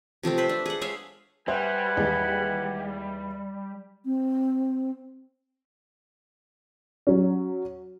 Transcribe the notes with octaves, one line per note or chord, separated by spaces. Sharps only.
C3 F3 A3 C4
B4 C5 E5
D4
G#4 F#5
G#3 C#5 E5 F5
G3 B4 C5 E5 F#5 G#5
D#2 E3 G#3
C4
F#3 C#4